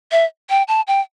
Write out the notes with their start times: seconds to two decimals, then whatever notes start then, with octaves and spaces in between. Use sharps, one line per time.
0.12 E5
0.50 G5
0.68 A5
0.87 G5